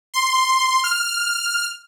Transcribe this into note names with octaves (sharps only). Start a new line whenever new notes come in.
C6
F6